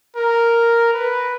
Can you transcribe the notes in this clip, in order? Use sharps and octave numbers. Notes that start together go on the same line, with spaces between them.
A#4
B4